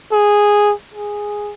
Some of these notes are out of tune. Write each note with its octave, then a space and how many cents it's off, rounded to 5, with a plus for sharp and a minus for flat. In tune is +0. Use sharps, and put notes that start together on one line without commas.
G#4 -5
G#4 -5